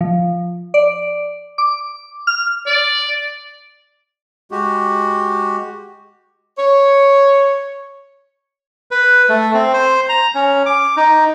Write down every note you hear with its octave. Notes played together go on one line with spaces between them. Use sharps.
F3
D5
D6
F6
D5
G#3 F#4 G4
C#5
B4
A3
C4
C5
A#5
C#4
D6
D#4